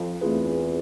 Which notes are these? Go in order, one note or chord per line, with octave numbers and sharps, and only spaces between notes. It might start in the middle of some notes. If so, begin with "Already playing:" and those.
Already playing: F2 F3
E2 E3 A3 C4 F4 G#4 B4